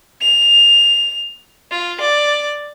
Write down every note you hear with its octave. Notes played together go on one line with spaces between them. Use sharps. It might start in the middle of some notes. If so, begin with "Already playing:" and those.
F7
F4
D5